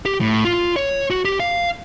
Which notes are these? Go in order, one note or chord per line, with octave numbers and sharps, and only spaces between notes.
G4
A2
F4
C#5
F#4
G4
F5